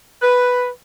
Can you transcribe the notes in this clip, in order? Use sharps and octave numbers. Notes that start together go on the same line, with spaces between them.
B4